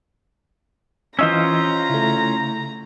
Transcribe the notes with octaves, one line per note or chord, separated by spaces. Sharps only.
E3 C#4 F4 C5 D#5 A#5 E6
C#3 A3 E4